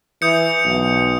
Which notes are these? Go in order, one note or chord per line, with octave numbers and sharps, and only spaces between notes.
E3 D#6 G6 C#7
B1